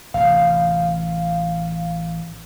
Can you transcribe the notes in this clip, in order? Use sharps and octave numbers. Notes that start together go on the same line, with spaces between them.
A1 C3 F5